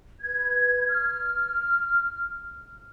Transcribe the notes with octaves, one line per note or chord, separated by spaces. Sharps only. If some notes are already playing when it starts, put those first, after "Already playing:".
B4 G#6
F6